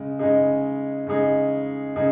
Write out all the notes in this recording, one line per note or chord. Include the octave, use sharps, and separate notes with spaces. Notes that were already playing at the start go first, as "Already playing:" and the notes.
Already playing: C#3 G#3
C#3 G#3 D#4 G#4
C#3 G#3 D#4 G#4
C#3 G#3 D#4 G#4